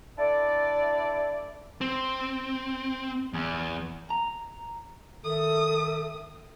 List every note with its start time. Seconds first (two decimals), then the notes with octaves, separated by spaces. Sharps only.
0.18 D4 E4 A4 D5
1.81 C4
3.33 E2
4.10 A#5
5.24 D#3 A4 E5 D#6